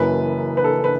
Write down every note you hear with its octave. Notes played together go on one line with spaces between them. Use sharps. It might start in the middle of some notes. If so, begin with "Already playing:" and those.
Already playing: F#1 F#2 E3 B4
B4
A4
B4